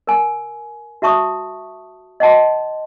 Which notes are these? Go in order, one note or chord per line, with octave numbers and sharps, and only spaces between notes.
A#4 G#5
F#4 E5 A5 C#6 D#6
D#5 F#5 A5 C6